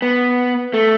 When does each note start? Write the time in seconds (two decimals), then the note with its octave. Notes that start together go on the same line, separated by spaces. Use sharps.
0.02 B3
0.74 A3